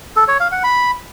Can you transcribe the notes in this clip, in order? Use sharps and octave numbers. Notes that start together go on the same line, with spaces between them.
A4
C#5
F5
F#5
B5